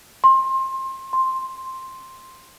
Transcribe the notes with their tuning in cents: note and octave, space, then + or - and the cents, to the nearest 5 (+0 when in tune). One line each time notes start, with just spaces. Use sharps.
C6 +25
C6 +5